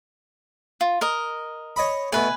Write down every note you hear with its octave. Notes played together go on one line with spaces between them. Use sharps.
F4
A#4 D#5
C#5 D#5 B5
B2 A3 B4 G#5